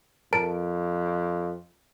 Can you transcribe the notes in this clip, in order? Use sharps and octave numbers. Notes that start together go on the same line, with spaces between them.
F2 A#4 A5 D7